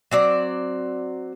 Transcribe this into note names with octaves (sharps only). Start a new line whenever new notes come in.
F#3 C4 D5